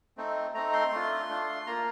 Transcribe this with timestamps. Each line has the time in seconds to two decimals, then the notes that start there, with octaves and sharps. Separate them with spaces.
0.17 A3 C4 D#4
0.54 A3 C4 D#4 A#5
0.73 C6
0.91 A3 D4 F4
1.28 A3 D4 F4
1.67 A#3 F4 A#5